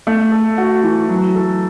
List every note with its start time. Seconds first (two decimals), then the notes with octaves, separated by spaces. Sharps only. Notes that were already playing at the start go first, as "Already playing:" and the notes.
0.07 A3
0.32 A4
0.58 F#4
0.84 E3
1.09 F#3
1.35 A4